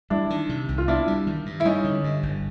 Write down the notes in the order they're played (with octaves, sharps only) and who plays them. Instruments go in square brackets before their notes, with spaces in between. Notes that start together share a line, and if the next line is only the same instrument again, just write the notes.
[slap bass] G3 [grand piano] D4 E4
[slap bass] D#3
C3
C2
[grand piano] F4
[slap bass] B3 [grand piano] D4 E4
[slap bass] G3
D#3
G2
[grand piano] E4
[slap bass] G3 [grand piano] C#4 D#4
[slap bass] D3
G2
G1